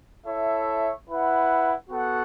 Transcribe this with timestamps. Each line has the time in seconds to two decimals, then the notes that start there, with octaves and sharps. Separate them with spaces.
0.26 E4 A4 C#5 E5
1.09 E4 B4 F#5
1.90 B3 F#4 A4 F#5